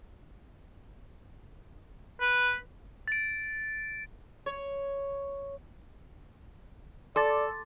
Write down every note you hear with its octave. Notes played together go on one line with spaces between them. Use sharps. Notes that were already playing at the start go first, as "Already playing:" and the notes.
B4
A6 D7
C#5
A4 D5 C6 D6 A6